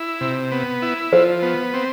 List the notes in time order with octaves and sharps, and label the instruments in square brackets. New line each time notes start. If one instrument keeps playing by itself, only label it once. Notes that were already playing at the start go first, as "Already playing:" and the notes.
Already playing: [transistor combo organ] E4
C3
B3
E4
[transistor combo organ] F3 [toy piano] C5
[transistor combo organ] B3
C4